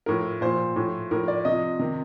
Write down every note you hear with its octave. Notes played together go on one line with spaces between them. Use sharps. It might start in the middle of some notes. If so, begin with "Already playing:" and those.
A2 F3 A#4
A#2 F3 C5
A2 F3
A2 F3 A#4
D5
C3 F3 D#5
C3 D#3